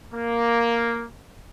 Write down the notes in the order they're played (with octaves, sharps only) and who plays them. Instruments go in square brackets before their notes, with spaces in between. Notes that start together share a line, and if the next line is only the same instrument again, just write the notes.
[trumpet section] A#3